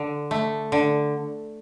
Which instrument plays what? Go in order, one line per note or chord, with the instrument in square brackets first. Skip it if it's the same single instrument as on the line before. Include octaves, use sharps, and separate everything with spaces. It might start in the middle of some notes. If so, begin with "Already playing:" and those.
Already playing: [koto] D3
A3
D3